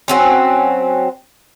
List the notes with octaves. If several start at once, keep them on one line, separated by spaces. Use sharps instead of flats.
F#3 C4 C#4